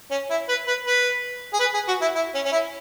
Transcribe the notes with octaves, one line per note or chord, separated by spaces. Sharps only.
C#4
E4
B4
B4
B4
G#4
B4
G#4
F#4
E4
E4
C#4
C#4
E4